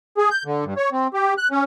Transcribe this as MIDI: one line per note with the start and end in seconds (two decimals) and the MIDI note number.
0.18 0.29 68
0.31 0.44 91
0.45 0.64 50
0.65 0.74 43
0.77 0.90 73
0.92 1.08 60
1.14 1.34 67
1.38 1.48 90
1.51 1.64 61